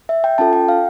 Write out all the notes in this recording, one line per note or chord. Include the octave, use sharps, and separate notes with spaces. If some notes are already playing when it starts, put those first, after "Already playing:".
E5
G5
C#4 F4 A4 A5
G5
F5